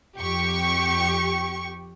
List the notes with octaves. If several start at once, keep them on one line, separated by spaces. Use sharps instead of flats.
F2 G4 C#6